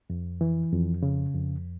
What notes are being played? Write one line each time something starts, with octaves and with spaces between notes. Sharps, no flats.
F2
E3
F2
C#3
F2